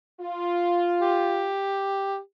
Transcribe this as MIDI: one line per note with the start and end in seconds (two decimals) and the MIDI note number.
0.20 1.51 65
1.02 2.18 67